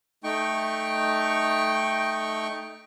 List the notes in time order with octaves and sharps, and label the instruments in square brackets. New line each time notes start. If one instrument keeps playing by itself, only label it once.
[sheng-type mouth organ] A3 D#4 G5 C#6